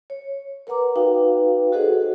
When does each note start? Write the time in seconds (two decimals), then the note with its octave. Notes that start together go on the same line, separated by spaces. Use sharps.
0.10 C#5
0.67 A#4 B4 F#5 A#5 D6
0.96 D#4 F#4 B4 F5 G5
1.72 F#4 G#4 A4 C5 D#5 F#5